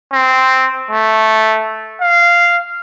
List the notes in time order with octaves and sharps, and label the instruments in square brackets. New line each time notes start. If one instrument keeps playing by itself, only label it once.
[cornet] C4
A3
F5